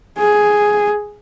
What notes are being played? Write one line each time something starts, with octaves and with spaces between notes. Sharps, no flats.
G#4